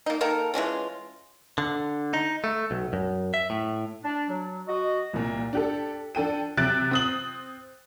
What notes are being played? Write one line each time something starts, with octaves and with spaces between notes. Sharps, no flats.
A#3 D#4
D#3 A#3 A4 A#4
E3 G#3 C#4 F4
D3
D#4
A3
B1
F#2
E5
A2
D4
F#3
F#4 D#5
C2 A#2
D4 G4 A4
D4 A4 G5 D#7
C3 F#3 E5 F#6 A6 D7
C4 D#6 F#7